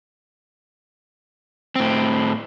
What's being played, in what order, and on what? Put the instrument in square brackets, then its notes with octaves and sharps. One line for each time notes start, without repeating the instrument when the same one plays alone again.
[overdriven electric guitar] A2 C4